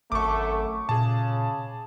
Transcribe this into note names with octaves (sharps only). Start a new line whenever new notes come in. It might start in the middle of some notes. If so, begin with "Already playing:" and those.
G#1 F#2 A3 C#6 D6
A#2 C#3 G#4 A5